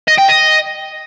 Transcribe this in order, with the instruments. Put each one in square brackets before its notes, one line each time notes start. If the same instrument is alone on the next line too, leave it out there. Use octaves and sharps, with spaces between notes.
[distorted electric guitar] D#5
G5
D#5